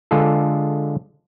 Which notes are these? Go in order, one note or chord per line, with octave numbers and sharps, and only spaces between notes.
D3 G#3 F4 G#4 A4